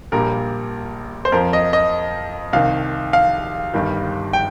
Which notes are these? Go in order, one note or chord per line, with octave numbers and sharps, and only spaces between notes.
A#1 A#2 G3 A#4
C5
F2 F3 A#4
D#5
D#5
C2 C3 D#3 F5
F5
G1 G2 D#3 G3
G5